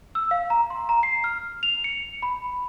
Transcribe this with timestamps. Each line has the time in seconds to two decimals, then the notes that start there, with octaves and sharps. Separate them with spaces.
0.15 E6
0.31 F5
0.50 A#5
0.70 C6
0.89 A#5
1.03 C7
1.24 F6
1.63 F7
1.84 C#7
2.22 B5